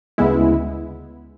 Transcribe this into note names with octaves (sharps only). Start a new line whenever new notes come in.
D2 C#3 G#3 B3 E4